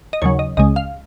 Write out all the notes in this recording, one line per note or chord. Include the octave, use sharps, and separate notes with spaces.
D#5
D#2 C#3 F#3 C#5
D#5
C#2 C#3 G#3 D#5
F5